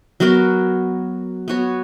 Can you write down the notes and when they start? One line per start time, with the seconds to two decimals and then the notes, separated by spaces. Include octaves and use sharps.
0.20 F#3 B3 F#4 A#4
1.48 B3 F#4 C#5